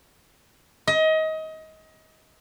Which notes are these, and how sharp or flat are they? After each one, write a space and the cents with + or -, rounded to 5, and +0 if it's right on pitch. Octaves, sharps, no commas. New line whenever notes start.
D#5 +25